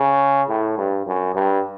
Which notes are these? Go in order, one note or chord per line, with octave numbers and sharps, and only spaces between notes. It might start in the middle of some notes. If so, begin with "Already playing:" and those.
Already playing: C#3
A2
G2
F#2
G2